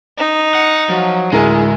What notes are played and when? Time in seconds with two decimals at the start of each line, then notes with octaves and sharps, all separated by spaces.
0.18 D#4
0.55 F#5
0.90 F3 F#3
1.32 D1 G#3 E4 G#4 A#4